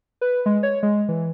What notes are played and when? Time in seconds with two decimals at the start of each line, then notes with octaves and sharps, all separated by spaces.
0.21 B4
0.46 G#3
0.63 C#5
0.83 G#3
1.09 E3